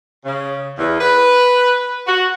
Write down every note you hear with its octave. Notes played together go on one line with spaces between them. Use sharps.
C#3
E2
B4
F#4